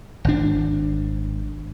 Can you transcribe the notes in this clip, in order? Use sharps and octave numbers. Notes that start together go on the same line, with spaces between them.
G#1 D4